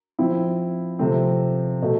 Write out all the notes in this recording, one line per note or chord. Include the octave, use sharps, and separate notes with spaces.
F3 C4 E4
C3 F3 A3 C4
B2 A3